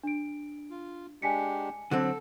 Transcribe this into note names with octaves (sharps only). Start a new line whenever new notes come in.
D4 D7
F4
G#3 D4 G4 G#5 B6 C#7
D3 F#3 C4 A4